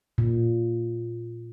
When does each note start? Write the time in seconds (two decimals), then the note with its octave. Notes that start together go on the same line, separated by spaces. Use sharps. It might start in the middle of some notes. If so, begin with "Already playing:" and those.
0.18 A#2